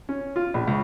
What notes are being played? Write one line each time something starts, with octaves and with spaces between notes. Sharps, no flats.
C#4
F4
A#1
C#2